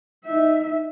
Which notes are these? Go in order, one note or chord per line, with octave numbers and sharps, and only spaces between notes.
D#4 E5